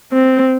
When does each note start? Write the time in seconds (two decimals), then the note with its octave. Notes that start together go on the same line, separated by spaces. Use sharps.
0.13 C4